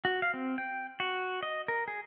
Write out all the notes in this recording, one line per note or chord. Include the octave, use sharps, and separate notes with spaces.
F#4
F5
C4
G5
F#4
D#5
A#4
G#4